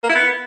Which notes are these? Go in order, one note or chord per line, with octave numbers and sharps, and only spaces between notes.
A#3
E4
B3